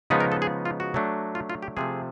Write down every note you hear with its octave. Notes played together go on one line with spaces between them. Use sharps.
C#3 F3 G#3 B3 D#4 B4
A#4
A4
G#4
F4
F#4
F#3 A3 D4
F4
F4
G4
C3 F3 A3 G#4